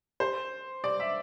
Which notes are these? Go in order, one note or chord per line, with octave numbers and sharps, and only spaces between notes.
C5
D5
E5